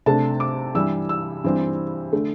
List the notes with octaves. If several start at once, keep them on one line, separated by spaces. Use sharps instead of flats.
C3 A3 D4 A5
D6
G2 E3 G3 E6
E6
G2 E3 G3 C4
D3 A3